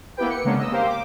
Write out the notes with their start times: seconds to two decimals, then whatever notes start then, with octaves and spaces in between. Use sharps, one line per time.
0.17 A#3 B3 E4 G4 B4 G5
0.30 C#7
0.44 C#3 G#3 A#3 B3 C#4 D4
0.59 D#5 E6
0.72 A#3 G4 A#4 C5 F5
0.88 D6